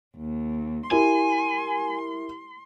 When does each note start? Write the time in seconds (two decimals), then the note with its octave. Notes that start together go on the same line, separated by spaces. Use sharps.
0.17 D#2
0.91 E4 G4 A#4 G#5 C6